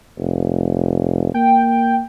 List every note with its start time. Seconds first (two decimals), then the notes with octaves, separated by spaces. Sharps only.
0.18 F1
1.34 A#3 G5